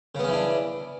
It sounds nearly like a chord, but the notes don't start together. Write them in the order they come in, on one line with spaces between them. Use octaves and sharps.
C#3 B3 C#4 E3 D4